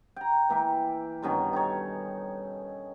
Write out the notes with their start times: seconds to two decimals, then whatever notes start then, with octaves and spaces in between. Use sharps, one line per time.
0.16 G5 A#5
0.49 E3 A#3 E5 G5
1.23 G2 B2 D#3 C#4
1.53 D#4 A4 C#5